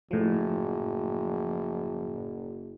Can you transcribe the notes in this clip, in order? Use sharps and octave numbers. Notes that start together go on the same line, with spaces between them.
F#1 A2 F3